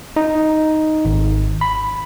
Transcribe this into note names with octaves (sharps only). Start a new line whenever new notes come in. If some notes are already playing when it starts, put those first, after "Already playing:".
D#4
G#1
B5